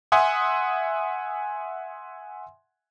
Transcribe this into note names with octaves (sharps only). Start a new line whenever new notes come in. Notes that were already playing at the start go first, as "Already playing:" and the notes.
E5 F#5 G#5 C6 D#6